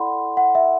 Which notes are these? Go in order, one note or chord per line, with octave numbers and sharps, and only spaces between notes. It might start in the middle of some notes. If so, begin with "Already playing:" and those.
Already playing: E4 A4 D5 F#5 B5 C6
F#5
E5